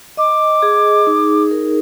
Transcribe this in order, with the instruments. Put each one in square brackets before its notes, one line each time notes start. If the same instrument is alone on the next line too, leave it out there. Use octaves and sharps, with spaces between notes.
[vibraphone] D#5 [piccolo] D6
[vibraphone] G#4
D#4
A#4